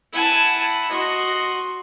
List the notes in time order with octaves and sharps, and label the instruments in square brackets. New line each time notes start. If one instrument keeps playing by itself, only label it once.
[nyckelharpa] E4 F#5 [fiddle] G#5 A5
[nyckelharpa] F#4 D#5 [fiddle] C6